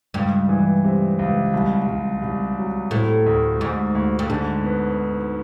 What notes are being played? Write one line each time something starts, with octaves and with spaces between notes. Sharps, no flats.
C#2 G2
E3
C3
C#2
C2
C2
C2
F#3
A2 C3
D2
D2 G#2
D2
G2
G#2 D3
B3